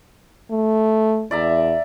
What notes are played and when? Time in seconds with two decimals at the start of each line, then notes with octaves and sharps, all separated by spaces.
0.51 A3
1.31 E2 D5 E5 A#5